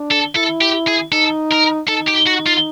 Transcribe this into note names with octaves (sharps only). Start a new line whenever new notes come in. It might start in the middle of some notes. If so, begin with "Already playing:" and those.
Already playing: D4
A4
E4 A4
G4
G#4
D#4 A4
A#4
D#4 A4
G4
F#4
F4